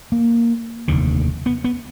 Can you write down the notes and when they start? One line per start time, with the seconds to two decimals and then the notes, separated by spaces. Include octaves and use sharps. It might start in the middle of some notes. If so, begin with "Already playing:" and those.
0.12 A#3
0.88 F1 D#2 D3
1.46 B3
1.64 B3